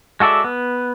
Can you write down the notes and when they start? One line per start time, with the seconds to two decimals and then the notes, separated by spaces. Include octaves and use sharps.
0.20 G#3 F#4 A4 D5 E5
0.44 B3